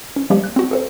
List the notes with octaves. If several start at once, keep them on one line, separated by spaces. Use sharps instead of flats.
C#4
F3 G3 G#3 A#3 G4
F#6
C4 E4 F#4
G#4 A4 C5